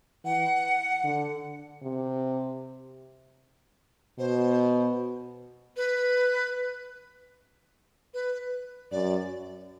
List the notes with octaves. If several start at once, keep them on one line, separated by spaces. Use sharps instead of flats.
E3 F#5
D3
C3
B2 C5
B4
B4
F#2 D5